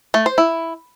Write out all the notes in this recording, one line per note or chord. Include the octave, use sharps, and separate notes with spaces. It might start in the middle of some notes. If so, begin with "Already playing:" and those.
A3
C5
E4